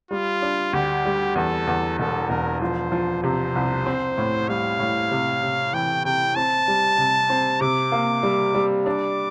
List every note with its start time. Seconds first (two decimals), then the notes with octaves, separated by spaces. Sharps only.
0.11 G3 F4
0.42 D4
0.73 D2 G4
1.05 G3
1.35 E2 A4
1.67 E2
1.98 E1 A4
2.30 E1 A#4
2.61 F3 C5
2.92 F3
3.23 C3 C5
3.55 C2
3.86 C4
4.18 A2
4.49 G3 F5
4.79 A2
5.11 C3
5.43 C3
5.73 E3 G5
6.05 C3 G5
6.36 C4 A5
6.68 G3
6.98 C3
7.30 C4
7.61 C3 D6
7.92 A#3
8.23 G3
8.54 G3
8.86 D4 D6